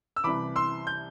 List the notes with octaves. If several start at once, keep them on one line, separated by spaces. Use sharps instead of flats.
E6
C2 C3 E3 B5 D6
C6 E6
G6